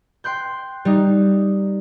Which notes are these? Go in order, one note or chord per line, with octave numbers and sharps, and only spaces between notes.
G5 C6 F#6 G6
G3 D#4